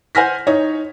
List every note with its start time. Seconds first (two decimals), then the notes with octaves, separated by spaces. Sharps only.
0.15 C5 F#5 G#5 F6 A#6 B6
0.47 D#4 C#5